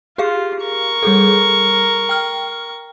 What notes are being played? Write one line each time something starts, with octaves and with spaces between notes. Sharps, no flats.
F4 G4 G#4 F5
A#4 C#6
G3 G#4 A4
G5 F6